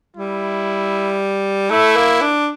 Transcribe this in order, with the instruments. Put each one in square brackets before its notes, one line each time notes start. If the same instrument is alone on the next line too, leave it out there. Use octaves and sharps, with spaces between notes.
[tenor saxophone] G3 [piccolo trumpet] E4
[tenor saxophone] A3 [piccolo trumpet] E4
[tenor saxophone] A#3
D4